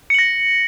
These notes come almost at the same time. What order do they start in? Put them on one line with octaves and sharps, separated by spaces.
C#7 F#7 A#6